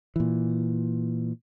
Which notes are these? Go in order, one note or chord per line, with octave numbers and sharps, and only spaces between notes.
A#2 E3